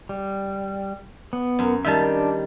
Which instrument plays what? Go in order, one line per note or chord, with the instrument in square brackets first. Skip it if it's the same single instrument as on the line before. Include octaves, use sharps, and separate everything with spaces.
[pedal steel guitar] G3
B3
[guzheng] F#2
[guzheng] D#3 G3 [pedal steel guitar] E5 A5
[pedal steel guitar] D4